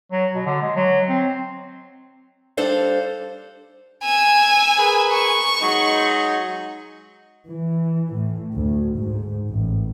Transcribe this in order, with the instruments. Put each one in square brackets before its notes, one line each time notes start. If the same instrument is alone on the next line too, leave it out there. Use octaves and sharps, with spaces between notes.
[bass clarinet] F#3
B2
D3
G#3
F#3
C4
[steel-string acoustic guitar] G3 D4 A4 C5 D5 F5
[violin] G#5 E6
[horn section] G#4 A#4 B4
[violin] C#6
[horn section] F#3 G#3 D#4
[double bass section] E3
A2
D2
G#2
A1